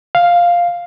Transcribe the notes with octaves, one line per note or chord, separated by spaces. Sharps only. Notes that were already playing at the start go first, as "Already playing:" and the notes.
F5